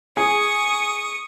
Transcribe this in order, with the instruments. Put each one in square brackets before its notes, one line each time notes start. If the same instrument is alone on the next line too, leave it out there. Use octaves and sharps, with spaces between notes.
[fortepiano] G#4 [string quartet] C#6 D#6